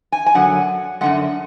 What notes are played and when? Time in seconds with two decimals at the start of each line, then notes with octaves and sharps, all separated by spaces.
0.12 G#5
0.26 G#5
0.35 F#2 D3 F#3 F#5
1.01 F#2 D3 G#3 F#5